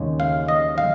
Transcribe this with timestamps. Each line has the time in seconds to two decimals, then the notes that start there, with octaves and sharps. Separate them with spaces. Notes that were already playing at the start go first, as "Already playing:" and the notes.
Already playing: D#2 C#3 G#3
0.20 F5
0.48 D#5
0.78 F5